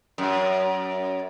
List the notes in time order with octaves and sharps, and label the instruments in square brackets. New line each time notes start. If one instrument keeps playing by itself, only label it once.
[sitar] F#2